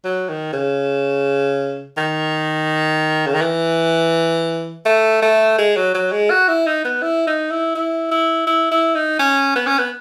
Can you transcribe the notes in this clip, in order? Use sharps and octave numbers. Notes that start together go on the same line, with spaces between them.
F#3
D#3
C#3
D#3
C#3
D#3
E3
A3
A3
G#3
F#3
F#3
G#3
F#4
E4
D#4
B3
E4
D#4
E4
E4
E4
E4
E4
D#4
C#4
B3
C#4
B3